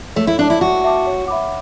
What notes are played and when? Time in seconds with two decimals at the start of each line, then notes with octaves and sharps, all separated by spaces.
0.16 A3 C#5
0.27 E4
0.39 D4 E5 A5 D6
0.50 E4
0.61 F#4 C#5
0.84 E5 A5 D6
1.07 C#5
1.28 E5 B5 D6